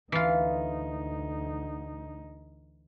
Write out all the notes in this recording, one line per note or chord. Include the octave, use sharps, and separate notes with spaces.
D2 E3 D#4 F4